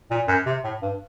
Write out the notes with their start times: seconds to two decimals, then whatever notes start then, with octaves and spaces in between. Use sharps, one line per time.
0.11 A#2
0.28 F#2
0.46 C3
0.64 A2
0.82 G2